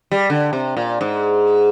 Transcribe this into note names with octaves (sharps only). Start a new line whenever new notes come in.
G3
D3
C3
A#2
G#2